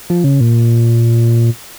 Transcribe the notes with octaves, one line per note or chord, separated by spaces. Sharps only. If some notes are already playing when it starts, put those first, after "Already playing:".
F3
C#3
A#2